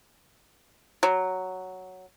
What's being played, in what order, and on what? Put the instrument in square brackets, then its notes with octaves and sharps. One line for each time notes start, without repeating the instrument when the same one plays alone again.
[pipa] F#3